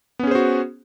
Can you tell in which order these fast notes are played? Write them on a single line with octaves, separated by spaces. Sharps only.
B3 C#4 G#4 C5 F#4